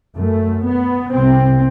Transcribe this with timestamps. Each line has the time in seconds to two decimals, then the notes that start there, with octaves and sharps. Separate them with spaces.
0.16 F#2 A3
0.65 B3
1.12 C2 C3 C4